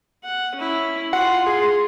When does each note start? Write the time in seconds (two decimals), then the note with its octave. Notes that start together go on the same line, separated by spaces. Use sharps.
0.24 F#5
0.56 C#4 E4
1.13 F4 F#5 C6
1.47 G#4